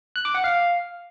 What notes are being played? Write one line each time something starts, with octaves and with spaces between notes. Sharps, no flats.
F#6
D6
F#5
F5